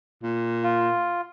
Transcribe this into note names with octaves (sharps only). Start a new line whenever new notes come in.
A#2
F4